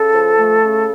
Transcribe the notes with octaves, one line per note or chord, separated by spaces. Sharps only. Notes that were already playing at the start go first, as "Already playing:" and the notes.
Already playing: C#3 A4
F3
A3
C#3